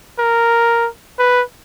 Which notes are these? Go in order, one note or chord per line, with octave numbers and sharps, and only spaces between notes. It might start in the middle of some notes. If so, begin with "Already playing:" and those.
A#4
B4